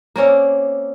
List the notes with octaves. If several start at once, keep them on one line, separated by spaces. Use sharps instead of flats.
A#3 C4 C#4 D5